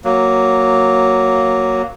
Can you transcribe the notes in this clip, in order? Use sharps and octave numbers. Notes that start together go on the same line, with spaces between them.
F#3 A#3